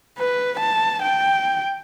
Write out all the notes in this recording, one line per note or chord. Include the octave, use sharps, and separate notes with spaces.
B4
A5
G5